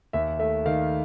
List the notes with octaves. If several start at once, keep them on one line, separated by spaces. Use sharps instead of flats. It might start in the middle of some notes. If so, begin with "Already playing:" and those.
D#2 E5
A3 E5
D#3 F5